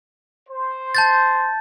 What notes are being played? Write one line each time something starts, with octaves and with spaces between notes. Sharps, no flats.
C5
A5 G6 A6